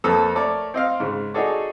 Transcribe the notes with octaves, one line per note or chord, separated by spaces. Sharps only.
F2 A#3 A4 B4 C5 D#6
A3 A#4 C#5 D5
C4 D#5 F5
G#2 C#3
D#4 F#4 G#4 A4 C#5 D5